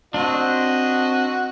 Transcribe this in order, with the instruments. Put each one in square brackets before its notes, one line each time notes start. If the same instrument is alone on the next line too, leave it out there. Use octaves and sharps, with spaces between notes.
[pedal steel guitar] C4 D4 [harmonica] F#4 D#5